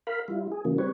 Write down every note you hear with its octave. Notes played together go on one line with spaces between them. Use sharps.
A#4 F5 B5
G3 E4 F4
G#4
C#3 E3 F#3 A#3
G3 C4 B4 C#5